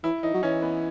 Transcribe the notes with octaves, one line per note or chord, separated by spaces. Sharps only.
E3 E4
E3 D#4
F#3
E3 C#4
B3